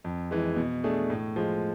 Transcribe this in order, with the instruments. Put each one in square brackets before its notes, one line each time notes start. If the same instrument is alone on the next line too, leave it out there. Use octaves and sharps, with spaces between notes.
[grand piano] F2
E3 G#3
B2
A3 D4 G#4
A2
F3 G#3